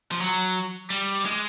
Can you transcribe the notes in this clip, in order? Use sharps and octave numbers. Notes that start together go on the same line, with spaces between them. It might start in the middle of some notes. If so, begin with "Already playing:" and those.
F3
F#3
G3
G#3